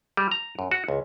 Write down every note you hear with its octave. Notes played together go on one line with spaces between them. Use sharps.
G3
A#5
F#2
F#4
C#2